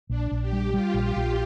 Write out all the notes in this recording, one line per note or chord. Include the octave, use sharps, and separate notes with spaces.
A#1 D4
A#1
G4
G3
G3 F4
A#1
G4
A#1